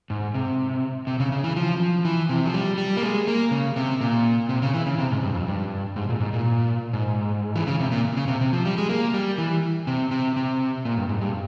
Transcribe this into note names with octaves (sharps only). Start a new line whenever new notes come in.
G#2
C3
C3
C#3
C#3
E3
F3
F3
E3
C3
F3
G3
G3
A#3
G#3
A#3
C#3
C3
A#2
C3
C#3
E3
C#3
C3
G#2
G2
F2
G2
G#2
A#2
G#2
A#2
G#2
E3
C#3
C3
A#2
C#3
C3
C3
F3
G3
G#3
A#3
G3
E3
C3
C3
C3
A#2
G2
G#2
G2